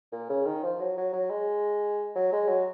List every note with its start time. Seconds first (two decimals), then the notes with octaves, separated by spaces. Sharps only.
0.12 A#2
0.29 C#3
0.45 D#3
0.63 F3
0.80 F#3
0.97 F#3
1.13 F#3
1.30 G#3
2.15 F#3
2.32 G#3
2.48 F#3